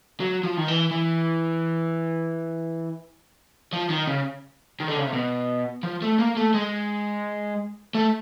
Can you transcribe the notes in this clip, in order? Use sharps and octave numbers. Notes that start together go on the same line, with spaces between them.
F#3
F3
D#3
E3
E3
F3
D#3
C#3
D#3
D3
C#3
C3
B2
F3
A3
A#3
A3
G#3
A3